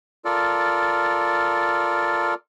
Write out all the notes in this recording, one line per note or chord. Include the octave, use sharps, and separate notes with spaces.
F4 A4 A#4 D5